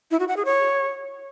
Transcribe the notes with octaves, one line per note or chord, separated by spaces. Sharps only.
E4
F#4
F#5
G#4
C#5